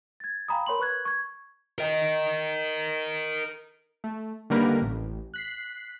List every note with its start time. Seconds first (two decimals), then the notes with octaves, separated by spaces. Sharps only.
0.20 G#6 A6
0.48 F5 G5 G#5 A#5 B5 D#6
0.66 A#4 C#5 B5 C6 F#7
0.80 B4 C#6 F#6 G#6
1.05 C#6 G#6
1.78 A#4 D#5
4.04 A3
4.50 D3 D#3 G3 A#3 A#4 B4
4.82 A1
5.34 F#6 B6 C7